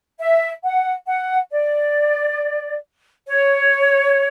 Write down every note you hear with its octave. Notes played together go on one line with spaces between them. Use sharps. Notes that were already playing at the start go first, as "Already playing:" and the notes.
E5
F#5
F#5
D5
C#5